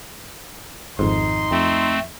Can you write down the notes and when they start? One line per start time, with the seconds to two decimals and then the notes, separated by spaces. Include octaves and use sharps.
0.99 G#1 F2 G#2 D#4 C6
1.51 F2 A3 C4